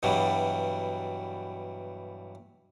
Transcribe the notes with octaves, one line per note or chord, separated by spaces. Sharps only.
G2 B2 E3 F#3 G3